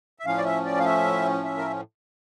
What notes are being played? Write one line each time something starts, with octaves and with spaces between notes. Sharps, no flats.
E5
A2 F3 C#4 F5
D5
E5
D5
F5
E5
E5
A#4